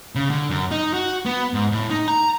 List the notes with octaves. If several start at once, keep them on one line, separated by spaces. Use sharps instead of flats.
C#3
D3
F#2
D#4
F#4
B3
G#2
A2
D#4
A#5